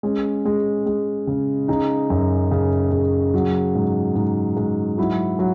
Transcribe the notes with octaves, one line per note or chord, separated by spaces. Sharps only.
G#3 C#4
G#3
G#3
C#3
C#3 D#4
F#2
C#3
C#3
F#3
G#2
G#2
G#2
F#3 E4
F#3